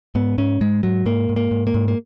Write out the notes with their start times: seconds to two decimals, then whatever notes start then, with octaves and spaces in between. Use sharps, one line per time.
0.15 G#2 B3
0.38 G#2 C#4
0.61 G#2 G#3
0.83 G#2 F#3
1.06 G#2 A#3
1.29 G#2
1.36 A#3
1.51 G#2
1.67 A#3
1.74 G#2
1.88 A#3